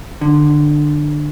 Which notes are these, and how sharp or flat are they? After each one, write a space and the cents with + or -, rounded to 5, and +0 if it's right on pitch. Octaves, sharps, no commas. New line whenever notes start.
D3 +15